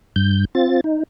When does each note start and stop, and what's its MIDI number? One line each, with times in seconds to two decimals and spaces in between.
0.16 0.45 43
0.16 0.45 91
0.55 0.81 60
0.55 0.81 65
0.55 0.81 93
0.84 1.03 63